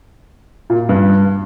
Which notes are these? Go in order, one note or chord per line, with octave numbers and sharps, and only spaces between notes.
A#2
G2